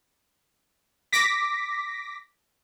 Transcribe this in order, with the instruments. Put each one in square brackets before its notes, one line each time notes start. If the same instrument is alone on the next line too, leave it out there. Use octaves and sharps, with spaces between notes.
[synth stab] D6 A#6 B6